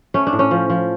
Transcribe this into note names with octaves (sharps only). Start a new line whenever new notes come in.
A3 C#4
D4
A2
C#4
F3
F3